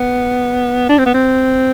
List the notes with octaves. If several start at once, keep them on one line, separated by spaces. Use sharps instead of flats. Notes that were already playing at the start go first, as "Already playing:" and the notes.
Already playing: B3
D4
C4
B3
C4